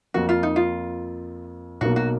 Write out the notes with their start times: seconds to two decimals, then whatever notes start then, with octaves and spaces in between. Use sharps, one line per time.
0.14 F2 F3 A#3 F#4
0.29 F4
0.43 D#4
0.56 F4
1.81 B1 B2 A#3 F#4
1.96 F#4